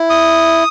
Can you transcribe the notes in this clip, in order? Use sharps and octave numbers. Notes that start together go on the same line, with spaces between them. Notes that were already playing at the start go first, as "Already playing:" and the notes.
Already playing: E4
D#6